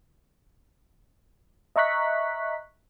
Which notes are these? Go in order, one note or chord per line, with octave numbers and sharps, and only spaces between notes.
D#5 E5 A#5 C#6 F#6 B6